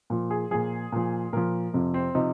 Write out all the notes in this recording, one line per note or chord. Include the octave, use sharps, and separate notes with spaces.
A#2 F3
G#4
A#2 F3 G#4
A#2 F3
A#2 F3 A#4
F2 C3 F3
C4
C3 F3 D#4